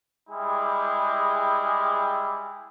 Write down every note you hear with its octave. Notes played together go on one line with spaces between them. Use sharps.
G3 G#3 E4 G4 G#4